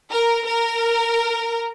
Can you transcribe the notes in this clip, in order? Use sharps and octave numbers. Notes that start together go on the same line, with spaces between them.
A#4
A#4